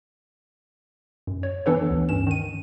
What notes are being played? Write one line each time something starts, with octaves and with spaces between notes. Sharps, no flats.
F#2
C#5
E3 B3 D4 A4 B4 C#5
D2
G2 C#4 E7
D#3 D#7